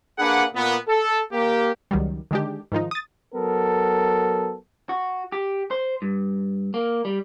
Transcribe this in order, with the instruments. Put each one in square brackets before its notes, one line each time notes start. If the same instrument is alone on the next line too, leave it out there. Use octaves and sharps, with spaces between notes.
[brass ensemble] A#3 D4 G#4 B4 F#5
A#2 B3
A4
A#3 G4
[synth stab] C#2 D#3 F#3 G3
D3 D#3 G#3 D4 G4
G#2 D#3 F3 D#4
D#6 A6
[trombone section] F#3 B3 A4 A#4
[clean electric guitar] F#4
G4
C5
G2
A#3
G3